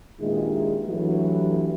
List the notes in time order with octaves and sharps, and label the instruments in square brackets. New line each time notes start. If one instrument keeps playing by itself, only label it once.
[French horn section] G2 A#2 D#3 G#3 E4 G#4
G2 E3 F#3 A3 E4 F#4